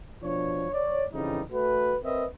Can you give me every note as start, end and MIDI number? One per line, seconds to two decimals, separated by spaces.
0.22 0.68 47
0.22 0.68 53
0.22 0.68 62
0.22 0.68 73
0.72 1.03 73
0.72 1.03 74
1.13 1.40 41
1.13 1.40 49
1.13 1.40 52
1.13 1.40 55
1.13 1.40 63
1.51 1.96 57
1.51 1.96 66
1.51 1.96 71
2.03 2.24 60
2.03 2.24 70
2.03 2.24 71
2.03 2.24 75
2.03 2.24 76